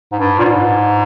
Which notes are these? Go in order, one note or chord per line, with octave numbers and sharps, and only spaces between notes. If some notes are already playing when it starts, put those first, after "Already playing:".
G#2
G2
A#2
G#2